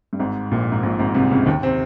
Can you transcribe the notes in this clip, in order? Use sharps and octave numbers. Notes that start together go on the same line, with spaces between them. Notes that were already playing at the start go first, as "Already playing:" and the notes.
G2
G#1 G#2
A#1 A#2
G#2
A#1 A#2
G#1 G#2
C2 C3
C#2 C#3
D#2 D#3
C3 C4